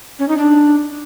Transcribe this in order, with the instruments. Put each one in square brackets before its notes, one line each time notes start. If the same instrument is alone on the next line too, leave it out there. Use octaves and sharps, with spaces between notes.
[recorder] C#4
D#4
D4